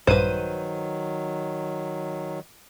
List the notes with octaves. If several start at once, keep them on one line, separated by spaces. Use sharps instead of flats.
A#1 G2 D#3 F#3 B4 C5 D#7